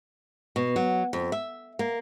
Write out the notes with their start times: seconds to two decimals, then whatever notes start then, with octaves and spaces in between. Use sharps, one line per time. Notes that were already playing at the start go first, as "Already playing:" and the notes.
0.56 B2
0.76 F#3
1.13 F2
1.32 E5
1.79 A#3